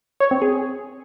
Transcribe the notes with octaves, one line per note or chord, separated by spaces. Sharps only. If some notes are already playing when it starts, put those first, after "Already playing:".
C#5
C4
G#4